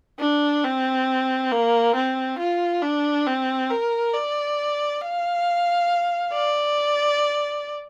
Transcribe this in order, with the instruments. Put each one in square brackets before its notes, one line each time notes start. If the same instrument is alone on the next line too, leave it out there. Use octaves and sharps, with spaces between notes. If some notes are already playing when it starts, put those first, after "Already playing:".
[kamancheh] D4
C4
A#3
C4
F4
D4
C4
A#4
D5
F5
D5